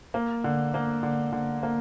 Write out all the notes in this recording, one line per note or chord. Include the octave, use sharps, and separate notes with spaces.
A#3
D3
A#3
D3
D3
A#3